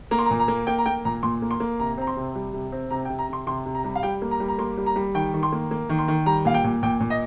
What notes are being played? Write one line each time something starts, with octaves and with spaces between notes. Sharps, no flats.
A#3 A#5
C6
A#5
A#2
A#5
A#3
A#3 G5
A#5
A#3 G5
A#2 A#5
A#2 C6
A#3
C6
A#3
C3 A#5
C4 A#5
C6
C3
G3
C3
C4
C3 A#5
G5
C3
A#5
C3 C6
C3 C6
C3
A#5
G3
F5
G3 G5
A#3
A#5
G3
A#5
A#3 C6
G3
A#5
G3
D#3 G5
D#3
C6
A#3
A#3
D#3
C6
D#3
G3 A#5
A#2 F5
G5
A#2
A#2 G5
A#2
D#5